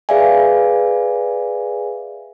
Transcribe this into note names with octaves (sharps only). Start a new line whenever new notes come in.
G#4 B4 D5 E5 F5 G#5